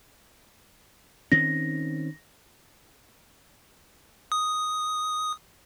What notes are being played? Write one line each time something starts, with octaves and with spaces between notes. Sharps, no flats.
D#3 C4 C#4 A#6
D#6